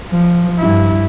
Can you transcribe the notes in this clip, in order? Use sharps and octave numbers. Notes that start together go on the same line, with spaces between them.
F3
G2 E4